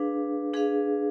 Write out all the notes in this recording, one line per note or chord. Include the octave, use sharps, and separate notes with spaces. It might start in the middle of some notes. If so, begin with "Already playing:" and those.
Already playing: D4 G#4 B4 F5
D4 G#4 B4 F5